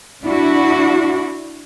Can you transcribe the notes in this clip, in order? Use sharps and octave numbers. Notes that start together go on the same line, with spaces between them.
D4 E4 F#4